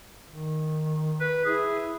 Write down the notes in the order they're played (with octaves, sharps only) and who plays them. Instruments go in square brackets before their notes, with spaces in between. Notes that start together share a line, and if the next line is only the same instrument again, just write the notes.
[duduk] D#3
[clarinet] B4
[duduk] E4 [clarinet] G#4